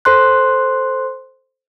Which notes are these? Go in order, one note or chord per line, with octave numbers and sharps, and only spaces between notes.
A4 C5 C6 F#6